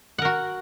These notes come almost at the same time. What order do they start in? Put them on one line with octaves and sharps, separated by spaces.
F#5 A#4 F#4